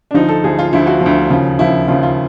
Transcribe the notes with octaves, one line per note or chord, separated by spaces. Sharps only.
D4
D2 D3 F3 D#4
A4
D2 D3 F3 G#4
F4
D2 D3 F3 E4
F#4
D2 D3 F3
D#2 C#3 F3
D#2 C#3 F3 E4
D#2 C#3 F3 F4
F4